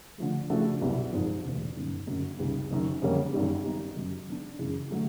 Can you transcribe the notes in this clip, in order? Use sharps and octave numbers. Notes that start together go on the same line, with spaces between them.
D3 F3 A3
C#3 F3 A3 D4 F#4
C2 B2 F#3 B3
G#1 G#2 F3
E1 D2 C3
G1 F#2 D#3
G#1 F#2 D3 F#3 A#3
C#2 C3 D#3 G3
F#1 F#2 D#3
F2 D3 G3 A#3 C#4
G#1 F#2 D#3 G3
D#3 G3 B3 D#4
F#2 D#3 F#3
D#3 G#3 B3 D4
F#2 C#3 E3
D3 F#3 A3